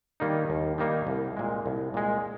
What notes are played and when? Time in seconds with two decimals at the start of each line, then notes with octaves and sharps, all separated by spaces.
0.20 D#3 G3 A#3 D#4
0.50 D#2
0.78 D#3 G3 A#3 D#4
1.07 C2
1.37 A#2 G#3
1.66 C2
1.94 A#2 G#3